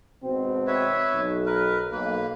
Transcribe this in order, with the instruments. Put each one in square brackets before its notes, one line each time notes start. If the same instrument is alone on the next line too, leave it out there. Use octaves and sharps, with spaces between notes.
[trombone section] G#1 B2 C4
[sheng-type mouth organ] B4 C#5 E5
[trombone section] B1
[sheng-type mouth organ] A#4 B4
[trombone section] B1 [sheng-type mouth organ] A#3 B4